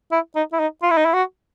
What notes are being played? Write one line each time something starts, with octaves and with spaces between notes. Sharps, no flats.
E4
D#4
E4
D#4
F4
E4
D#4
E4
F#4